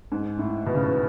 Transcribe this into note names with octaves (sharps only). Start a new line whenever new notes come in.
G#2
A2
B2
C#3
B2